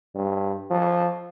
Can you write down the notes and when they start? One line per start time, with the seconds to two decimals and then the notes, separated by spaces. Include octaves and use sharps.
0.15 G2
0.70 F3